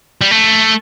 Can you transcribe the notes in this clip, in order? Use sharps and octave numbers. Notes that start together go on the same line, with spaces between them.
G3
A3